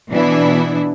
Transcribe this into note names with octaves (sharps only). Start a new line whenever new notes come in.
B2 E3 B3 D4 E4